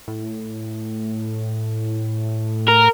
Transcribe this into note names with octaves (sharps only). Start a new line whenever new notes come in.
A2
A#4